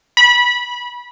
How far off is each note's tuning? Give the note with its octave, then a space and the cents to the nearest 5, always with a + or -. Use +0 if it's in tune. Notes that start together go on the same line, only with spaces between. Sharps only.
B5 -25